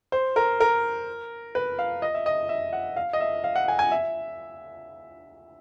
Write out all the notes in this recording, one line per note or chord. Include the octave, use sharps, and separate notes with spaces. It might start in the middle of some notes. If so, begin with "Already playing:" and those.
C5
A#4
A#4
B4
F5
D#5
E5
D#5
E5
F#5
F5
D#5
E5
F5
F#5
G#5
G#5
E5